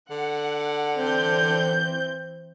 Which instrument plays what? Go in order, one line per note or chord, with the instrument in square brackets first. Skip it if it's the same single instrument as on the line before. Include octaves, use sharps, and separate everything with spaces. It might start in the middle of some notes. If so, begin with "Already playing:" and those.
[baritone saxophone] D3 [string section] F#5
[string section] E3 C4 G6